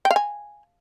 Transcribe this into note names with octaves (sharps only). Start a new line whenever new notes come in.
G5
F5
G#5